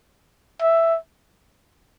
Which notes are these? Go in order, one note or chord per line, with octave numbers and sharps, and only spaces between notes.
E5